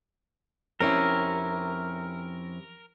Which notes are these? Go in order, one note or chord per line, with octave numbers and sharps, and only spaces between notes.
F2 C4 C#4 E4 G4 A#4 C#5